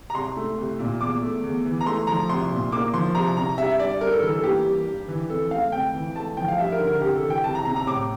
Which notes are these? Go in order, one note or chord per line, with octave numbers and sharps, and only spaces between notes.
A#5
C2 C6
A3
C2
A#2
E2 D6
A3
E2
E3
A#5
A3 C6
F3 A#5
C2 C6
A#2
A#3 D6
F3 C6
C2 A#5
C3 A#5
G2 E5
G3 D5
G2 A#4
A4
E3 A4
A4
A#3 G4
G3
G2
E3
F2 A4
A3 F5
F2 G5
E3
A3 A5
F3 G5
F5
G2 E5
A#4
D3
A#4
C2 G4
A4
E3
G5
C2 A5
A#5
C3 A#5
A#5
A2 D6